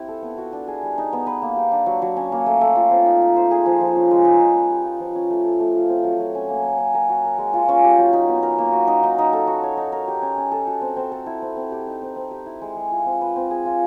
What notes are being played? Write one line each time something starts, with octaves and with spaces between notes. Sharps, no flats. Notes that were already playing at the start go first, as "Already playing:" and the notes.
Already playing: C4 E4 G4
A4
B3
F#4
D4
G#4
G3
D#4
B3
B4
A#3
G4
D4
F#3
F#3
C#4
A#3
A3
A3
F4
C4
D#4
D#4
C5
G#4
F3
F3
C#4
G#3
D#4
D#4
B4
G4
F4
F3
C#4
A3
A4
A3
F4
C4
F#3
F#3
C#4
A#3
C#4
C#4
A#4
F#4
A#4
G#3
F4
C#4
G4
F#3
D#4
B3
A#4
A#3
F#4
D#4
D#4
D#4
A4
F#4
C#5
D#4
A#4
G4
C#4
C#4
A4
F#4
C4
C4
A4
E4
C4
C4
G4
D#4
C4
C4
G4
E4
G#3
G#3
F4
C4
B4
C4
G#4
F4